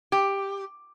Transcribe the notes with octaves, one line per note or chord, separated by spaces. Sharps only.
G4